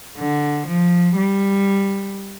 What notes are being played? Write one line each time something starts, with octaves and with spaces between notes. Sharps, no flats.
D3
F3
G3